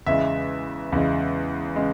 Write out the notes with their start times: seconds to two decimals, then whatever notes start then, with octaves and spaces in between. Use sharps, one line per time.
0.06 E2 C#3 G#3 E5
0.92 E2 C#3 G#3
1.76 C#3 G#3